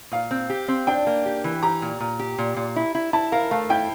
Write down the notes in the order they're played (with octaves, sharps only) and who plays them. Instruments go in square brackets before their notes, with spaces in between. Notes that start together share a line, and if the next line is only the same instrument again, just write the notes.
[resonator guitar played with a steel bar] A#2 [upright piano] F5
[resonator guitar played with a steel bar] C4
G4
C4
[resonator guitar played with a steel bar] D4 [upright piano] G5
[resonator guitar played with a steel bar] A#3
G4
E3
[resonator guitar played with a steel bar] G4 [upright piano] A#5
[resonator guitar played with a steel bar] A#2
A#2
G4
A#2
A#2
E4
E4
[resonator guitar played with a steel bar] E4 [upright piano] A5
[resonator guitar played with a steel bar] A#4 [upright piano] F5
[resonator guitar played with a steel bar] A3 [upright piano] F5
[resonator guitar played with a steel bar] E4 [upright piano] G5